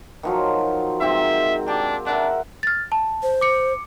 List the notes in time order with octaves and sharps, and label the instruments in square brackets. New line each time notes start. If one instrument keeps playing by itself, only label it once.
[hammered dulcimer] D#3 F3 F#3
[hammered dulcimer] G#2 D#3 C4 [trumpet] E5
[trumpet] D4 [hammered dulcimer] G4
[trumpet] D4 [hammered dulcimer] A#4 E5 F#5
[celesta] F6 A6
A5
[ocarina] C5
[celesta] D6 C#7